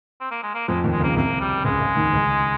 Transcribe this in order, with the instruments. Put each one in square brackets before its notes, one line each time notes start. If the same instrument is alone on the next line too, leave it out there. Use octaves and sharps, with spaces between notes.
[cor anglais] C4
A#3
G#3
A#3
[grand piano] F2 F3 [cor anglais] G#3
[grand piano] D#2 D#3
[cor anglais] G#3
[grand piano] C#2 C#3
[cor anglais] A#3
[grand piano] C2 C3 [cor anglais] A#3
[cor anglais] G3
[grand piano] C#2 C#3 [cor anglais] G#3
[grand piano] C#2 C#3
D#2 D#3
C#2 C#3